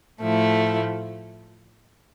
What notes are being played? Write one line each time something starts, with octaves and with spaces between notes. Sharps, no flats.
A2 F3 A3 E4